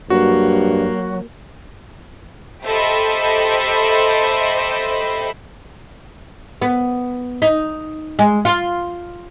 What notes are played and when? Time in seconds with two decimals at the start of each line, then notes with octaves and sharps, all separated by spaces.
0.10 G2 F#3 A#3 F#4
2.64 G4 A4 C5 D#5 E5 B5
6.62 B3
7.42 D#4
8.19 G#3
8.45 F4